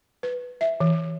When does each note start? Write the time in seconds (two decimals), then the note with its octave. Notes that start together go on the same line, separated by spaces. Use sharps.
0.23 B4
0.61 E5
0.80 E3